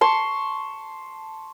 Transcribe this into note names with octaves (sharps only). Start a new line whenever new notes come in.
A5 C6 C#6